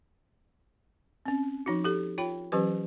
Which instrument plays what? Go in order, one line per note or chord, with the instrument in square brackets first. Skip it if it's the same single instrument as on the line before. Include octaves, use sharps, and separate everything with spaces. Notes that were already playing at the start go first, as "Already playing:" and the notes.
[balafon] C4 C#4
F3 D#4 F#4
G4 A4
F4 C#5 G5 B5
E3 F#3 C#4 G4 B4